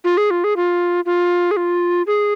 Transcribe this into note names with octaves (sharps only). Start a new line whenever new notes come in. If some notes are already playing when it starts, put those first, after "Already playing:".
F4
G#4
F4
G#4
F4
F4
G#4
F4
G#4